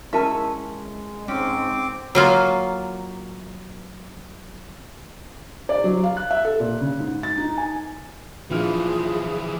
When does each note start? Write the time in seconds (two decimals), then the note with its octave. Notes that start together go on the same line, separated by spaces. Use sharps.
0.13 G#3 C#4 E4 A#4 E5 A5
1.28 G#2 C4 C#4 D6
2.15 F#3 A#3 F4
5.69 D5
5.84 F#3
6.04 F5
6.17 F#6
6.31 E5
6.45 A4
6.60 A#2
6.81 C#3
7.00 G#2
7.23 A6
7.38 D#4
7.58 G#5
8.50 A#1 E3 F3 E4 F4 G#4 F6